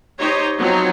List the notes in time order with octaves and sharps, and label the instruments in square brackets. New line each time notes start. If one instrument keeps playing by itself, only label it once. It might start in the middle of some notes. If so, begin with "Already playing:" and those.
[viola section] D#4 G4 C5 C#5
F3 F#3 B3 C4 D#4 C#5